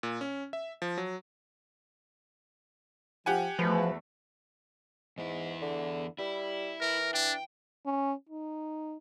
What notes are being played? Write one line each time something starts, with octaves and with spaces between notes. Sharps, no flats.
A#2
C#4
E5
F3
F#3
F3 G4 F#5 G#5
E2 F3 G#3 A3 F#4 B4
E2 G#2 E4
D3
G3 E4
E3 A#4
D4 G5
C#4
D#4